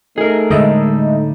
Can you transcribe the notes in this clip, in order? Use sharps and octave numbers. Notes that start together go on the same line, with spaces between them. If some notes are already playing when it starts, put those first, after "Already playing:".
A3 D#4 G#4 A#4
A2 D3 G3 G#3 D#5 E5